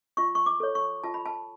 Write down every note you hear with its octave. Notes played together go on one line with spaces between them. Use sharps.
F4 C#6
C#6
D6
A4 C#5
C#6
F4 A5
B5
A5